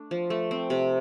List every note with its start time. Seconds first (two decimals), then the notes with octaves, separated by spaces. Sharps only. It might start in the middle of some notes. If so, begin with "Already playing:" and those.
Already playing: A3 D4
0.11 F3
0.30 A3
0.51 C4
0.70 C3